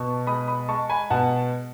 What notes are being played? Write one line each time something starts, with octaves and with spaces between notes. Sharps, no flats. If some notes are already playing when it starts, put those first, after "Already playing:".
Already playing: B2 A5 C#6
G#3 B5 D#6
B5 D#6
G#3 A5 C#6
G#5 B5
B2 F#5 A5